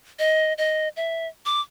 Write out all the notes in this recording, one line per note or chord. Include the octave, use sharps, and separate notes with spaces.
D#5
D#5
E5
D6